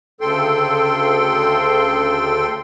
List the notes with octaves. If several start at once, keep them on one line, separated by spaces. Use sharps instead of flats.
D2 C#3 A4 G5 C6